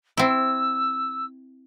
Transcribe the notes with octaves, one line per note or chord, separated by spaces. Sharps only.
C4 E4 E6